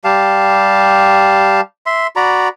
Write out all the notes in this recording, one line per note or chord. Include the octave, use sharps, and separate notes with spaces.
G3 G4 F5 A5
E5 C6
F#4 D5 A#5 B5